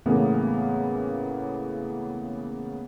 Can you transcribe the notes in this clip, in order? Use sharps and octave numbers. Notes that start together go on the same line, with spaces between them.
A2 C#3 E3 A#3 B3